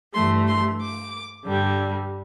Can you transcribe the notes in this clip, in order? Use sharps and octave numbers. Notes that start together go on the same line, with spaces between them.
G2 E3 A3 C6
C6
D6
G2 D3 G3